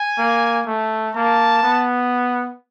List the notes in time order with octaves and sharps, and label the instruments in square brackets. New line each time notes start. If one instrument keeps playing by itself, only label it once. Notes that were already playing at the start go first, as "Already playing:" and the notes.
Already playing: [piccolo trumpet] G#5
[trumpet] A#3
A3
[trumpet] A#3 [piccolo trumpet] A5
[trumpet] B3